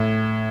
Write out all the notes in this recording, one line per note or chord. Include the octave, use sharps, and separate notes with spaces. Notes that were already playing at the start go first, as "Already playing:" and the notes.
Already playing: A2